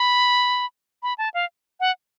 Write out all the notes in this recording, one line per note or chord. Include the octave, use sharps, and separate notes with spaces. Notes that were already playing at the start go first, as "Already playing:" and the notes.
Already playing: B5
B5
A5
F5
F#5